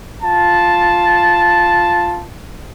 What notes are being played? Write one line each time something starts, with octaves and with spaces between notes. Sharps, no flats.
F4 A5